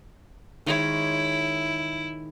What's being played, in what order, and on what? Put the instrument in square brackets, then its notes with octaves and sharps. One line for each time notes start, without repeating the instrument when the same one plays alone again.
[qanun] D#3 G#3 C#5 [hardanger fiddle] E4